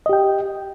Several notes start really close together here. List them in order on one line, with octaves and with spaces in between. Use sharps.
D#5 G4 G5